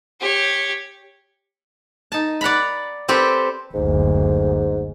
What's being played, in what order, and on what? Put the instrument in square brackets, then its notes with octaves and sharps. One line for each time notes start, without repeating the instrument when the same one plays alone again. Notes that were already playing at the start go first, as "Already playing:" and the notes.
[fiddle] G4 C#5
[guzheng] D#4 A5
D5 F#5 A#5 B5
C4 G4 A4 B4 G5
[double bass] F#1 D2 [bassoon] G#2